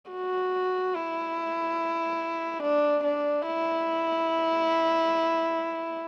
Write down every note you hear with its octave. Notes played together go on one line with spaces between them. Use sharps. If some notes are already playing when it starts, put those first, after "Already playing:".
F#4
E4
D4
D4
E4